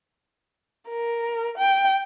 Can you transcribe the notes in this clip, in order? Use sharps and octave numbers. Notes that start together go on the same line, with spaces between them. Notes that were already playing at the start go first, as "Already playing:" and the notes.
A#4
G5